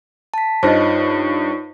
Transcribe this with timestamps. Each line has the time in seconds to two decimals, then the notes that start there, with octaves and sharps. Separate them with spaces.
0.34 A5 B6
0.63 G2 D#4 F4 C5 C#5 D#5 A#6